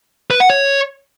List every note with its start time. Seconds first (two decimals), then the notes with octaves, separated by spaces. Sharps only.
0.31 B4
0.40 F#5
0.50 C#5